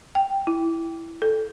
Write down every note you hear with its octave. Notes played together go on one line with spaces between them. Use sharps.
G5
E4
A4